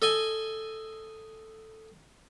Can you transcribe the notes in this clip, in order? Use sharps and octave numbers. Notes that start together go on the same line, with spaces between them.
A4 D#5 G#5